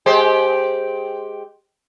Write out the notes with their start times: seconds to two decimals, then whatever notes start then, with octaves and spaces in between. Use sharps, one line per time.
0.06 G#3 G4 C5